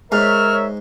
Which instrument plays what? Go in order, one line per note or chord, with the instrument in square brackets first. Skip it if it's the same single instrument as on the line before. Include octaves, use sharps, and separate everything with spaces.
[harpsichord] G#2 [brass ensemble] A#4 C#5 E5 [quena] F6